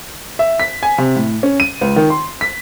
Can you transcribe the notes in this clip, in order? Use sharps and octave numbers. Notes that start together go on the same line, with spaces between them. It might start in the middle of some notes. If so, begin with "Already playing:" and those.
E5
B6
G#5
C3
A2
C#4
D#7
C#2
D#3
C6
B6